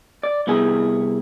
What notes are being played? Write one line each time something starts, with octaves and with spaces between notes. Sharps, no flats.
D5
C2 B3 E4 G#4